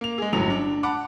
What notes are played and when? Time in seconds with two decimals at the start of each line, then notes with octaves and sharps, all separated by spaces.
0.01 A#3 F7
0.18 G#3 G#4
0.33 G1 A2 F#3 F7
0.50 D4
0.83 F#5 A5 B5 D6